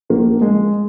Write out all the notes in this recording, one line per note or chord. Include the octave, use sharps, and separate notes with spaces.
A#1 A#3
G#3